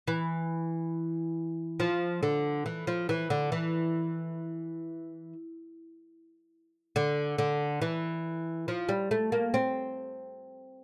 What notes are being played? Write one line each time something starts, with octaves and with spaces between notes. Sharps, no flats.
E3
F3
D3
E3
F3
E3
D3
E3
D3
D3
E3
F3
G3
A3
A#3
C4